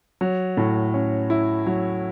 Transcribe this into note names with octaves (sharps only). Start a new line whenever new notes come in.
F#3
A2
C#4
E4
F#3